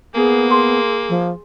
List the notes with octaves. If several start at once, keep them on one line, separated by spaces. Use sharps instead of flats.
A#3 B3 G#4
G#4 C6
F3